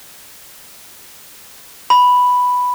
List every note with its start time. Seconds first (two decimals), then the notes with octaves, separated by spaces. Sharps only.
1.90 B5